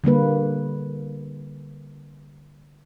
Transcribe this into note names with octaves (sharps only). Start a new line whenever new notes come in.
D3 G3 A#3 B4